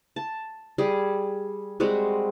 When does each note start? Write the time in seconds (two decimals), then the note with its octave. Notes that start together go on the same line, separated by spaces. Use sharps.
0.16 A5
0.78 G3 G#4
1.80 G3 G#3 C4 F#4